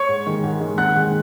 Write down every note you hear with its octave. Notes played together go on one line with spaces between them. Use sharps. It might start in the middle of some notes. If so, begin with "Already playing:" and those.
Already playing: C#5 C#6
G#2
D#3 G#3
G#2
D#3 G#3
G#1 F#5 F#6
G#2 D#3 G#3